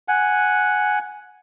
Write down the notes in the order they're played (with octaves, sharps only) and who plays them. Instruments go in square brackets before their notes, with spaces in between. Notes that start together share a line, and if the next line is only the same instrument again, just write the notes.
[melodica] F#5 G#5